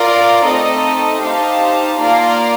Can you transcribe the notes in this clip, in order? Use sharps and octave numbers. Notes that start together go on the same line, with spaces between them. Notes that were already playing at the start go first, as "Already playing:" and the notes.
Already playing: F4 A#4 D5 F5
A3 C4 D#4 A4 D#5
D#4 G4 C5 F5 A5
A#3 F4 A#4 D5 F5